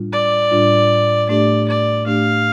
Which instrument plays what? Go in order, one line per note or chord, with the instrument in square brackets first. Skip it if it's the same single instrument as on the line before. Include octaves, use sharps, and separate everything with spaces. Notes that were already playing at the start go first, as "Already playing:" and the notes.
Already playing: [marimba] A2 G3 D4 F4
[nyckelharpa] D5
[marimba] A2 G3 D4 F4
[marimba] A2 A3 D4 G4 [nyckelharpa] D5
[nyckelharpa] D5
[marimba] A2 A3 D4 G4 [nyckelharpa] F5